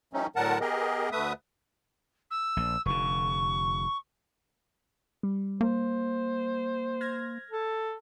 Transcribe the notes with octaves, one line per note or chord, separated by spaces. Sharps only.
E3 F#3 A3 C4 C#4 D#4
A2 D3 F#3 A#4 F#5 A5
B3 G4 G#4 A#4 D#5
D2 D3 A3 B4 E5 D#6
E6
A#1
F1 D3 C#6
G3
A#3 C5
F6 G#6 A#6
A4